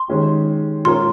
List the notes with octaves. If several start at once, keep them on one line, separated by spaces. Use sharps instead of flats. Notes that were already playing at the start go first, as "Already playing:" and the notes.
Already playing: C6
D#3 G#3 C#4 G4
A#2 G#3 C#4 F4 A#4 C6